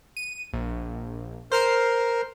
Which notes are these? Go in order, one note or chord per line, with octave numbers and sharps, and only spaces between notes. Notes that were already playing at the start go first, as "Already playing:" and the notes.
D#7
A#1
A#4 C5 F6 C7